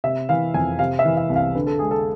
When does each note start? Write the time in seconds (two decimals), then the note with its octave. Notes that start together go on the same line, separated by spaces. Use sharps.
0.04 C3 E5
0.29 E3 F5
0.54 F2 G#5
0.79 C3 F5
0.99 E5
1.05 E3
1.17 E5
1.30 C2
1.36 F5
1.55 D3 B4
1.67 A4
1.79 G#3 G#4
1.91 A4